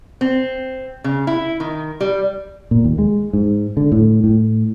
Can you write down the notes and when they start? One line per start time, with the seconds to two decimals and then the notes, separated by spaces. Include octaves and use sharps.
0.21 C4
1.04 C#3
1.27 E4
1.60 D#3
2.01 G3
2.71 A#2
2.84 D#2
2.98 G#3
3.33 G#2
3.77 D3
3.92 A2
4.24 A2